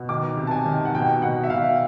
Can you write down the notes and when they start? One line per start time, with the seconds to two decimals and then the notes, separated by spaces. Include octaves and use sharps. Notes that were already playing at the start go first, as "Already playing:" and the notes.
Already playing: B2
0.09 D#3 D6
0.37 C3
0.47 A5
0.51 G#5
0.66 D#3
0.85 F#5
0.95 B2 G5
1.22 B2 F#5
1.44 E5
1.50 B2 F5